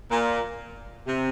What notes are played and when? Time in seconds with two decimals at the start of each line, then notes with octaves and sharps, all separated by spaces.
0.10 A#2
1.07 C3